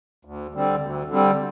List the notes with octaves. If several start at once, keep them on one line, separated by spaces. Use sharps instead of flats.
D2
D3 G3 C4
D2
D3 G3 C4